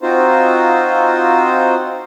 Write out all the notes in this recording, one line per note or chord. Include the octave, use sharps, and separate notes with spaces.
C4 D#4 F4 F#4 C5